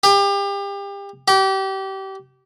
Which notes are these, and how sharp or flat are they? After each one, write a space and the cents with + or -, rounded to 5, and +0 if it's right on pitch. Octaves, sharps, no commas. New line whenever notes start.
G4 +30
G4 -30